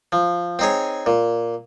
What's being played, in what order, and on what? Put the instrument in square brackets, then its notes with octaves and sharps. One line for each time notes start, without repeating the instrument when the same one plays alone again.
[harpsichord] F3
C4 D#4 G#4 C#5
A#2